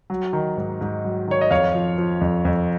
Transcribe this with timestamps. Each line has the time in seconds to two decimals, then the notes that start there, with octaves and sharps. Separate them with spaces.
0.10 F#3
0.33 D#3
0.57 G#2
0.81 G#2
1.05 F#3
1.28 D#3 C#5
1.41 D#5
1.51 F2 C#5 F5
1.75 F3
1.98 F3
2.21 F2
2.45 F2